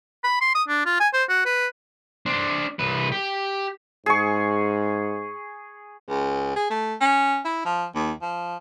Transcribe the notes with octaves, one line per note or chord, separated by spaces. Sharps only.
B5
C6
D#6
D4
F4
G#5
C5
F#4
B4
D4 C5
C2 B4
G4
G#2 G#4 C#6
C#2
G#4
A3
C#4
E4
F3
D#2
F3